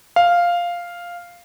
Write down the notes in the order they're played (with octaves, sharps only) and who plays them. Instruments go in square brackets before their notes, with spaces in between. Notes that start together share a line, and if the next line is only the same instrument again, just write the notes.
[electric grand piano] F5